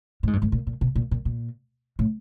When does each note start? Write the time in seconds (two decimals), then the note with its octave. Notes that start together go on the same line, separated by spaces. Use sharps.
0.23 A2
0.27 G#2
0.33 G2
0.42 G#2
0.52 A#2
0.67 A#2
0.81 B2
0.96 A#2
1.11 A#2
1.25 A#2
1.99 A2